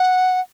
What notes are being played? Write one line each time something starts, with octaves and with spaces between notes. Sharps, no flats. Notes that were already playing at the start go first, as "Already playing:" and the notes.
Already playing: F#5